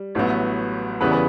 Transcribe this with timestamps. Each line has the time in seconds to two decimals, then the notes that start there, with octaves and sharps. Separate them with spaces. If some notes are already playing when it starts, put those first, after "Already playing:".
Already playing: G3
0.15 A1 A2 F#3 B3
1.01 E2 C#3 E3 G3 B3 B4
1.12 B4